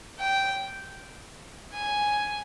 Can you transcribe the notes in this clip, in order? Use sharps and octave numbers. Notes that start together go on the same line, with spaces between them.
G5
G#5